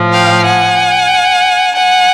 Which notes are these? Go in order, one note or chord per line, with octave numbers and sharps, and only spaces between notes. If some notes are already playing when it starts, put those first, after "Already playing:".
Already playing: A2 F3
F5 G5
F#5 G#5
F#5 G#5